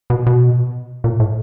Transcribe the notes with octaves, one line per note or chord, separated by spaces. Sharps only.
B2
B2
A#2
A2